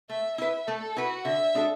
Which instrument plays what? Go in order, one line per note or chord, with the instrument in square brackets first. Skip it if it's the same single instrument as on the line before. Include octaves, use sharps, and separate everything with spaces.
[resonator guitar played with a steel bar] A3 [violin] E5
[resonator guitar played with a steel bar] E4 B4 [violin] E5
[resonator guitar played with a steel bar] A3 [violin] A4
[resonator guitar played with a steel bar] E4 B4 [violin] F#4
[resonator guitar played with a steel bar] D3 [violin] E5
[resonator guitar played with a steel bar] G#3 D4 F#4 A4